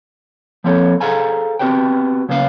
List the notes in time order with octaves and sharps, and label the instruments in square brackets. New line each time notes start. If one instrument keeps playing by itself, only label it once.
[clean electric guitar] F3 A#3 C4 A4 C#5
G#4 A4 C5 F5 G#5 A#5
B3 C4 F#4 G4 C5 G5
C#3 A#3 B3 C#4 C5 F5